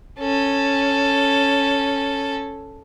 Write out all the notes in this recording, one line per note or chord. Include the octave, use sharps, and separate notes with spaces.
C#4 A4